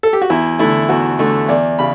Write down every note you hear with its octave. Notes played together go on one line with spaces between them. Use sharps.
A4
G4
F#4
E2 E4
D3 A3 E4
E2 F#4
D3 A3
E2 D5
C#3 B5